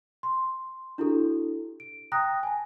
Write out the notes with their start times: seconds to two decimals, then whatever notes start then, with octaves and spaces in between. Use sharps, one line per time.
0.23 C6
0.98 D4 E4 F#4 G4 A4
1.80 D7
2.12 G5 A#5 D#6 F#6 A#6
2.43 G#5 A5